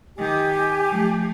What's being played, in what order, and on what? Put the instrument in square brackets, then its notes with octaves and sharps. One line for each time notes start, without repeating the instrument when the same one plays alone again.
[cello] D#3 [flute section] G4 G#5
[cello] F3 A3